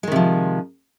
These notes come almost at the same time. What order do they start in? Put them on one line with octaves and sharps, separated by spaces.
G#3 D#3 C3 F3